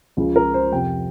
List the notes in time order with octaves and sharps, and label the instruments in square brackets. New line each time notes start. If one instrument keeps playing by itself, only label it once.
[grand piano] C#2 C#3 F3
A#4
C5
F2 C3 F3 G5